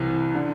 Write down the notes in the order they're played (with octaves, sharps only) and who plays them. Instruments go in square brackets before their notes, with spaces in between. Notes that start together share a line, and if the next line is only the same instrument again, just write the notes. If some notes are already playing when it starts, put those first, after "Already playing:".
Already playing: [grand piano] C2 C3 E3
D3